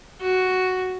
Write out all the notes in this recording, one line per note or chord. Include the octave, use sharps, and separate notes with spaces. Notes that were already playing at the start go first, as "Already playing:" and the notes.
F#4